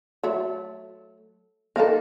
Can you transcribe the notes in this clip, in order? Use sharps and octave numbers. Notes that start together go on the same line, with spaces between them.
F#3 A3
D#3 A#3 A4 F5 A#5